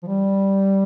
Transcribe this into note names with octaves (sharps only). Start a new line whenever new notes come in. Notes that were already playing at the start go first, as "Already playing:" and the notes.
F3
G3